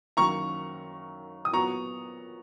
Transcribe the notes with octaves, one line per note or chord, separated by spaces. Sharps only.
F#2 D#3 F#3 A#3 A#5 C#6
D#6
A#2 F#3 B3 A#5 C#6